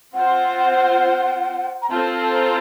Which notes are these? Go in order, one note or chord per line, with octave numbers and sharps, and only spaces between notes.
C4 F4 C5 F#5
A#5
C4 F4 A4 C5 A5
A#5